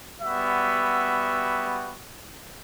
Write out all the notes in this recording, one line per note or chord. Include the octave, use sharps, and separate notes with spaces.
G3 B3 F#4 E5